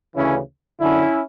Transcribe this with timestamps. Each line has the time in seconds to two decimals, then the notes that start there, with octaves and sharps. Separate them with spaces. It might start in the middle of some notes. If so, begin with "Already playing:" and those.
0.15 D2 C#3 E3 C#4 E4
0.80 F#2 D3 C#4 E4